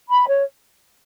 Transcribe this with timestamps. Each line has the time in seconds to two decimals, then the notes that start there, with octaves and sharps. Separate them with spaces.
0.10 B5
0.27 C#5